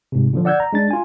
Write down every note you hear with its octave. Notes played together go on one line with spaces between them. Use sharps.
G#2 C3
A#2 D3 F3
D5 F#5 E6 G6 G#6
A#5
G#3 D4 A6
F4 G#5